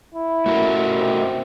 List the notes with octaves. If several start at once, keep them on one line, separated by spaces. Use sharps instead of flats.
E4
A3 F#4 A#4
C3